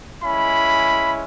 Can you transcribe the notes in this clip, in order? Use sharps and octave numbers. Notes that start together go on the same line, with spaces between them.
G#3 C#4 E4 B5